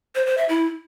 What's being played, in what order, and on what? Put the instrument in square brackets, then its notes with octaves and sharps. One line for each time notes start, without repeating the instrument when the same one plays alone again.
[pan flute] C5
C5
E5
E4